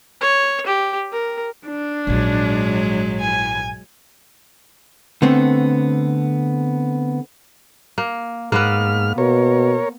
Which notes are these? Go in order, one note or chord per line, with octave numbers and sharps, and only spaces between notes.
C#5
G4
A#4
D4
A#1 G#2 F#3 G#3
G#5
D3 A3 B3 C4
A#3
G#2 A#3 B3 B4 F6
B2 A#4 C#5